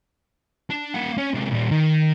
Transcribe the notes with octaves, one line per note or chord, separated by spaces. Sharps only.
D4
A#3 F#5
C#4
C3 G#3
A#2 G3
D#3